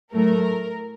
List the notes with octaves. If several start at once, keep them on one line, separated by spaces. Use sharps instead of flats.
A2 F#3 A3 A#4